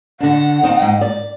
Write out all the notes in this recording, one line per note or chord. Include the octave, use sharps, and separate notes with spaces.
D3 D4 F#5
C4 D#4
G#2
D5